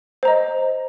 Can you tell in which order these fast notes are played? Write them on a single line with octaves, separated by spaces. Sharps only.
C5 A#5 D#5